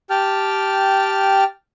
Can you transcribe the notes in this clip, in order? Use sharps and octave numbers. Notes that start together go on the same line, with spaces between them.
G4 G5 A5 F6